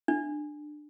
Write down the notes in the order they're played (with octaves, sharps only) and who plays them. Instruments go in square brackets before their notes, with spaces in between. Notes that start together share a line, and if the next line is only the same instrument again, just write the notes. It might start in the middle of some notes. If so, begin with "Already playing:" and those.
[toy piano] D4